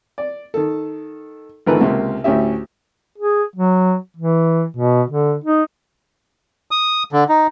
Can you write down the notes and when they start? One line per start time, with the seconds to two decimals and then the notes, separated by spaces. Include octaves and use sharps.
0.18 D5
0.54 D#3 A4
1.66 G#1 D3 E3 A3 A#4 B4
1.81 C#2 C3 A#3
2.24 D2 A2 C#4 G4 E5
3.18 G#4
3.56 F#3
4.16 E3
4.77 B2
5.10 D3
5.44 D#4
6.71 D#6
7.12 D3
7.29 D#4